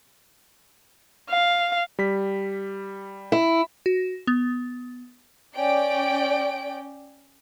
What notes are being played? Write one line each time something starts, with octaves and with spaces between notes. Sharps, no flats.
F5
G3 B6
E4
F#4
B3
C#4 D5 G5 D7